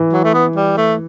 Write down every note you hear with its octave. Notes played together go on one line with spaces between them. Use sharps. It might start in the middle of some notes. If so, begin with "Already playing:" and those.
Already playing: E3
F#3
A3
B3
G3
A3